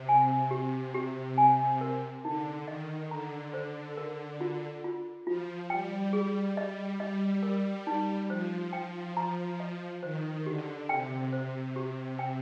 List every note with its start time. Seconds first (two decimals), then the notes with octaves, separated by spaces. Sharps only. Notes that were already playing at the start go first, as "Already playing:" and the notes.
Already playing: C3
0.09 G#5
0.51 G4
0.94 G4
1.38 G#5
1.81 A#4
2.24 D3 D#4
2.67 D#3 D#5
3.10 D3 A#5
3.54 C5
3.97 A#4
4.41 F4
4.84 F4
5.27 F3 F4
5.70 G3 G5
6.13 G#4
6.57 G3 D#5
7.00 G3 D#5
7.43 A#4
7.87 D#4
8.30 F3 C5
8.73 G5
9.17 A#5
9.60 D#5
10.03 D#3 C5
10.46 D3 G4
10.89 C3 G5
11.33 C5
11.76 G4
12.19 G5